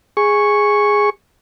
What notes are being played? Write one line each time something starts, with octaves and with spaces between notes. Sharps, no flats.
G#4 C#6